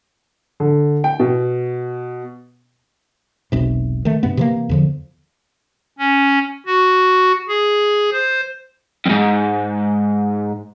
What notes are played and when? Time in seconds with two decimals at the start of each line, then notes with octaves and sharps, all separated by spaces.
0.60 D3
1.04 G5
1.20 B2
3.52 E1 B1 C3
4.05 D#3 A3
4.23 G2 C3 B3
4.37 C3 E3 A#3
4.69 E2 D3 F3
5.99 C#4
6.66 F#4
7.48 G#4
8.12 C5
9.06 F2 G#2